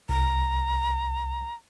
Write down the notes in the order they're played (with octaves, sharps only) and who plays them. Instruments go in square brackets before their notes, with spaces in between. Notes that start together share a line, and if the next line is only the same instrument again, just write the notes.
[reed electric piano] C2 [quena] A#5